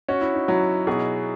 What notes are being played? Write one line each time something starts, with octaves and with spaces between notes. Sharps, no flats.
C#4 F#4
E4
D#4
F#3 E4
B2 G#4